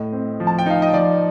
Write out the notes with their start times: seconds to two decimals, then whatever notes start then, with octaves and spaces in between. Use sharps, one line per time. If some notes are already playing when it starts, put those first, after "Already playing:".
Already playing: A2 D#5
0.12 C4
0.40 F3
0.47 A5
0.59 G5
0.66 D#4 F5
0.82 D#5
0.93 F3 D5